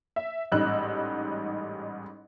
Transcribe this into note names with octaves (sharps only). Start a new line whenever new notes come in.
E5
A1 G#2 G3 D#4 E6 F#6